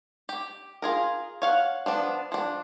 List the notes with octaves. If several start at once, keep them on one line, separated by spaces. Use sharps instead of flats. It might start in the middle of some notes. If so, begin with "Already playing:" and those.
G4
F4 G#4 A#4
C#5 F5 F#5
F3 B3 D4
F3 D4